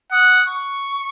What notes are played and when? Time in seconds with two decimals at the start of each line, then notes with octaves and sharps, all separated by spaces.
0.12 F#5 D#6
0.46 C#6